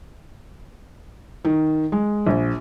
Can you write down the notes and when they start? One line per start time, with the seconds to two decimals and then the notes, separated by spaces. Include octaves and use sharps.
1.45 D#3
1.92 G#3
2.27 A#1